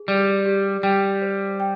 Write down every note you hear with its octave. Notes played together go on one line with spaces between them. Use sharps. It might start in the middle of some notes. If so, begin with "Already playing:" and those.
Already playing: G#4
G3 D5
G4
G3 G5
C5
G5